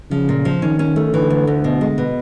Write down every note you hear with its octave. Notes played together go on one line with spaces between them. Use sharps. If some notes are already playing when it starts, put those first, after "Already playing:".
C#3 F3
A#2
F3
D#3 C#4
C#4
A3
D3 E3
D2
D2
B2
G#3
B2